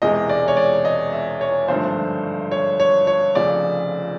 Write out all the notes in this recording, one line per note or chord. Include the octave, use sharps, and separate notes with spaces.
E1 E2 C3 E3 G#3 D#5
D5
C#5
D5
D#5
E5
C#5
G#1 G2 D3 F3 A3 C5
C#5
C#5
C#5
F1 F2 C#3 D5